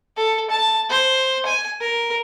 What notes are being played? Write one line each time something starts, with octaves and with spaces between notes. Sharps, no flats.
A4
A5
C5
G#5
A#4